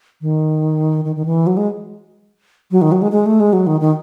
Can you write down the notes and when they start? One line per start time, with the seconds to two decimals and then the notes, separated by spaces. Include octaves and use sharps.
0.21 D#3
1.05 D#3
1.16 D#3
1.25 E3
1.47 F#3
1.57 G#3
2.71 F#3
2.82 D#3
2.92 F#3
3.02 G#3
3.12 G#3
3.26 A3
3.40 G#3
3.53 F#3
3.67 D#3
3.81 D#3